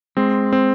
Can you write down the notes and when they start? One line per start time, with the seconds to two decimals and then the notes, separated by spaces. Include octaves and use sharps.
0.17 G#3 C4
0.53 C4